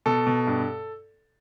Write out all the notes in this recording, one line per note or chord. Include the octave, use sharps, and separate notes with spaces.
B2 A4
B2
G2